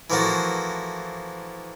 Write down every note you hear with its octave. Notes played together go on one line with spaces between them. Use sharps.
E3 F3 A3 A#3 F#4